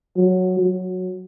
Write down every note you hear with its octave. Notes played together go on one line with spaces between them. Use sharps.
F#3
F#3